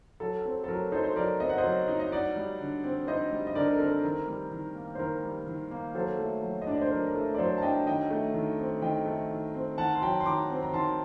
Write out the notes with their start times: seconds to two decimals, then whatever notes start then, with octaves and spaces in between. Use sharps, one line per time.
0.20 F#3 A4
0.45 C4
0.64 A4
0.68 F#3 A#4
0.92 D#4 A4 C5
1.04 C5
1.16 F#3 A#4 D5
1.40 C4 D#5
1.50 F#5
1.58 C5 D#5
1.64 F#3
1.88 D#4
2.00 D#5
2.12 D#4 D5 F#5
2.36 G3
2.60 D3
2.84 C4
3.07 D#4 C5 D#5
3.31 G3
3.47 D#5
3.55 D3 A#4 D5
3.68 A#4
3.74 A4
3.79 C4 A#4
3.92 A#4
4.04 D#3 A#4
4.28 G3
4.52 D#3
4.75 A#3
4.95 C5
4.99 D#3 A#4
5.23 G3
5.47 D#3
5.71 A#3
5.95 F#3 A4 C5
6.19 A3
6.43 F#3
6.62 D#5
6.67 D4 D5
6.82 C5
6.91 F#3 A#4
7.07 A#4
7.15 A3 A4
7.35 D5
7.38 F#3 A4 C5
7.58 A5
7.62 D4 D#5 G5
7.86 D#3 D#5 G5
8.11 A3
8.34 D#3
8.59 C4
8.82 D#3 D#5 G5
9.06 A3
9.31 D#3
9.54 C4
9.78 D#3 F#5 A5
9.95 C6
10.02 F#3 G5 A#5
10.20 C6
10.25 D#3 A#5 D6
10.50 C4
10.63 A#5
10.73 D#3 A5 C6